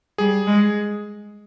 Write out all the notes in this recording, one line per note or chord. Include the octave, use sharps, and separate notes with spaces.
G3 G#4
G#3